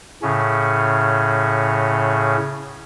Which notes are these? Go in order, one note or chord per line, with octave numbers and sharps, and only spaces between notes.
A2 C#3 C#4